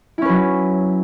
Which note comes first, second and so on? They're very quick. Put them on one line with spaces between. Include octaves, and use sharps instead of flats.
E4 C#4 B4 F#3